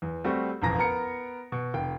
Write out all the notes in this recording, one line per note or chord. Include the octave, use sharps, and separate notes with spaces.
E2
G3 A3 C4 F#4
E1 A1 F2 A#5 A#6
B3 A#4 A#5 C#7
B2
F1 G5